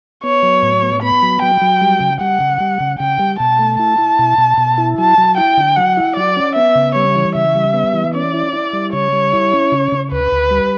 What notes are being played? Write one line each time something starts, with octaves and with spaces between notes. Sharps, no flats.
B3 C#5
F#3
A2
B3
B3 B5
F#3
F#3 G5
F#3
G3
C#3
G3 F#5
C#3
G3
C#3
C#3 G5
G3
B2 A5
A3
E4 A5
E4
B2
B2
B2
E4
F#3 A5
F#3
E4 G5
D3
F#3 F#5
E4
F#3 D5
C#4
B3 E5
C#3
G3 C#5
E3
C#3 E5
G3
B3
E3
C#4 D5
E4
E4
G3
C#3 C#5
G3
E4
C#4
C#3
C#3
D2 B4
D2
G3